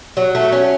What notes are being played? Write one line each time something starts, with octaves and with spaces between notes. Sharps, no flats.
F#3
A3
C#4